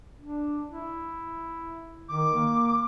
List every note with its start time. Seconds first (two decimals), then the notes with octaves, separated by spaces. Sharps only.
0.21 D4
0.70 E4
2.09 D#3 D6
2.34 A#3